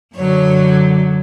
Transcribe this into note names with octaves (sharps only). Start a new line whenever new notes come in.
F#2 D3 F#3 C#5